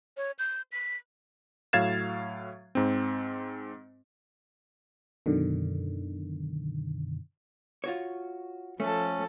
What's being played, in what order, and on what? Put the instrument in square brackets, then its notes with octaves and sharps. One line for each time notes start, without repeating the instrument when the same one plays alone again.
[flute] C#5
G6
B6
[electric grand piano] A2 F#3 F5 G#6 A6 E7
G#2 C4
[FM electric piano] F#2 B2 D3 D#3
[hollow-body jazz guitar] F4 F#4 C#5
[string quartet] F3 A4 [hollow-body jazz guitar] A3 [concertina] C#4